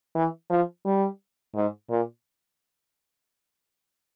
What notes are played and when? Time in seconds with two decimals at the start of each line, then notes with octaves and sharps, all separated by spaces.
0.15 E3
0.50 F3
0.85 G3
1.55 G#2
1.90 A#2